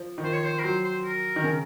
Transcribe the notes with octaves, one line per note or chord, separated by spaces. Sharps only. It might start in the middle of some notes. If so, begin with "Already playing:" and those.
Already playing: F3
D#3
F3 C5
C#5
C5
A#4
F#3 C5
C5
A#4
D#3
C#3